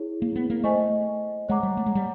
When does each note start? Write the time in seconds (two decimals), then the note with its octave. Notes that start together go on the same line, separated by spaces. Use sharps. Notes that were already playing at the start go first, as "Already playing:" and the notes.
Already playing: E4 G#4 C#5
0.22 A#3
0.36 B3
0.50 A#3
0.64 A3 C5 D#5 G#5 C#6
1.49 G#3 C#5 F#5 A#5 D6
1.63 G3
1.77 A3
1.86 G#3
1.95 G3